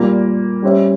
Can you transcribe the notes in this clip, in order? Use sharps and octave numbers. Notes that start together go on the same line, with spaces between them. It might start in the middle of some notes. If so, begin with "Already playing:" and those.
Already playing: A#2 G3 A#3 F4
G3 C#4 G4 C5 E5